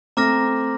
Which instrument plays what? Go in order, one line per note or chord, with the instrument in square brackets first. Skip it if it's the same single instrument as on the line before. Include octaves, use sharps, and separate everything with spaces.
[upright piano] A3 C4 [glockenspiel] A#5 D6 F6 A#6